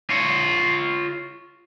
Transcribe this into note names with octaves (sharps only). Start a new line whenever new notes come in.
F4 C#5